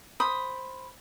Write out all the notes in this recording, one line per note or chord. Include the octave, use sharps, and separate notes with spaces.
C5 B5 D#6